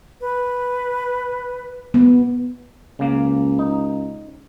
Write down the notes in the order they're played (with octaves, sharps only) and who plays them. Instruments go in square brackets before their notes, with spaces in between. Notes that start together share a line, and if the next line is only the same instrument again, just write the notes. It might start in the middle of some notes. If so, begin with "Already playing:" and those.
[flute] B4
[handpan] B3
[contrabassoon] C#2 [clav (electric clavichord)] C#3 A#3
[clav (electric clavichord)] D#4